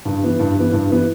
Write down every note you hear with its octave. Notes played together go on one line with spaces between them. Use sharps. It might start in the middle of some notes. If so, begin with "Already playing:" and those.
G2
E3 B3
G2
E3 B3
G2
E3 B3